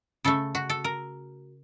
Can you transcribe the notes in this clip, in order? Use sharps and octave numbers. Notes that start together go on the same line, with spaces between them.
C#3 A3 A4
F#4
A4
A#4